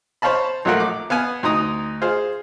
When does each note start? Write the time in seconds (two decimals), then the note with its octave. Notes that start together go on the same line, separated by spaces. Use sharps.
0.22 C5 C#5 F5 A5 B5
0.65 A#1 F#3 A3 F4 A#4 F#5
0.80 D6
1.10 B3 F5 G#5
1.43 D2 D#4 A#5 D#6
2.02 F4 G#4 C5 F5